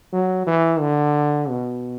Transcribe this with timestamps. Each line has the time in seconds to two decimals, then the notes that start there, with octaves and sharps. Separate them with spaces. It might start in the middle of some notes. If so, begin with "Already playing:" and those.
0.13 F#3
0.47 E3
0.80 D3
1.49 B2